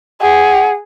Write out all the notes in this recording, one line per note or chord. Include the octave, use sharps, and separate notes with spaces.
G#4 F#5